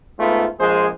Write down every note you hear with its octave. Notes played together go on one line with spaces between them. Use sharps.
G#2 A3 B3 F4
A#1 F3 G#3 G#4 C5